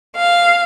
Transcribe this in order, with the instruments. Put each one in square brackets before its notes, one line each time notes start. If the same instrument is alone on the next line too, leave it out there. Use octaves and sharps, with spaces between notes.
[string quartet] F5